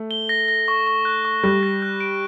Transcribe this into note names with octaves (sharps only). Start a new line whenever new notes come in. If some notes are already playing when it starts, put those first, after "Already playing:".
Already playing: A3
G7
A#6
A#6
C#6
C#6
F#6
C#6
G3 F#6
A#6
F#6
D7